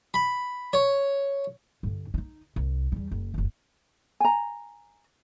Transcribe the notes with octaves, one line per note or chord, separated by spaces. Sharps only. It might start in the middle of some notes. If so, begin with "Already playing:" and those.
B5
C#5
G2 D3
C#4 D#4
C2
E2 G3
F#1
F#1 D#2
G#5 A#5